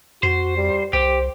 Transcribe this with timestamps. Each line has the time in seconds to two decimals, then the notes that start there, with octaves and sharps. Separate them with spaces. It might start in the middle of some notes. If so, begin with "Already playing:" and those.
0.23 F2 F#4 C5
0.57 G3
0.93 C2 G4 C5